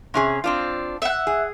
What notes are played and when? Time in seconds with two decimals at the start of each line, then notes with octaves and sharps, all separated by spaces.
0.14 C3 C#4 G#4
0.44 C4 D4 F4
1.02 E5 F#5
1.27 G#4